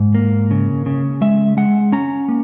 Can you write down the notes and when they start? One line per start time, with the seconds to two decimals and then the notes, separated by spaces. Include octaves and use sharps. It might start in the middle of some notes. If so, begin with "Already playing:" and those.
Already playing: G#2
0.15 A#3
0.51 C#3
0.86 C#3
1.21 G#3 E5
1.57 G#3 F#5
1.92 C#4 A#5
2.28 A#3